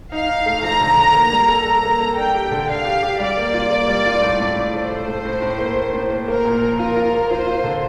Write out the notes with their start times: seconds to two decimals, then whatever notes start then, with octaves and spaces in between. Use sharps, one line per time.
0.12 D#4 F5
0.29 D#4
0.46 A3
0.63 F3 A#5
0.81 D3
0.97 D3
1.15 A#3
1.32 G3
1.48 A4
1.66 A4 A#5
1.83 A#3
2.01 A4
2.17 D4 G5
2.35 G4
2.52 D3
2.69 D4 F5
2.85 G4
3.03 G4
3.19 G3 D5
3.37 A#3
3.54 F4
3.71 A#3
3.88 G3
4.06 F4
4.22 A2
4.40 A2
4.56 A2
4.74 A3 C5
4.91 A4
5.08 A2
5.25 A2
5.42 A2
5.59 A#3
5.76 A#3
5.93 A2
6.10 A#3
6.27 A#3 A#4
6.45 A#2
6.62 F3
6.79 F4 A#4
6.96 F4
7.14 A#3
7.30 F4 C5
7.47 F4
7.64 D3